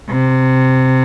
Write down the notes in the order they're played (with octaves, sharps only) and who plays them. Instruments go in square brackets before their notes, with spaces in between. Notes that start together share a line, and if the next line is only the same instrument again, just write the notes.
[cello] C3